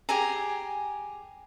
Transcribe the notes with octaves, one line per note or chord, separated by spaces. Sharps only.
G4 G#4 G#5 A#5